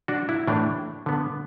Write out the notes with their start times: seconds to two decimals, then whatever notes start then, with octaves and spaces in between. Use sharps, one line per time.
0.08 D4 F#4
0.29 E4
0.47 A2 E3 A3 D4
1.06 D3 B3